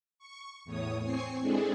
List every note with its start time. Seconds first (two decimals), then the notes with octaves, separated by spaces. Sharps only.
0.19 C#6
0.65 E2 A2 C#5 D#6
1.03 C4 G#5 C#6 C7
1.41 G#3 C4 D4 E4 G#4 A4